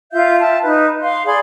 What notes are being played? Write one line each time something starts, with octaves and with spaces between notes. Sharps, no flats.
F4 E5 F5 G6
E5 G5 A5
D#4 B4
F5 C6
G#4 D5 B5 C6